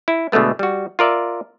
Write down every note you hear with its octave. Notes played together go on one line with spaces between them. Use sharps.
E4
B2 D3 G#3 A3 B3
G3 F#4
F4 A#4 D5 E5